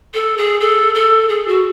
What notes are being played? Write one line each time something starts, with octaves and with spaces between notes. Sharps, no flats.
A4
G#4
A4
A4
G#4
F#4